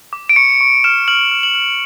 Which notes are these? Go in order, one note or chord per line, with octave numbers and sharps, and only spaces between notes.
D6
D7
C#6 C#7
C#6
F6 E7
F6 F#7
F6
F#7
F6